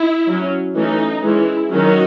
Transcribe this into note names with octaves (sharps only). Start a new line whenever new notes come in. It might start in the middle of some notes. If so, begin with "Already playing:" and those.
Already playing: E4
F#3 C#4
E3 A3 C#4 D#4
E3 G#3 C#4 E4
D#3 F#3 C#4 D#4 F#4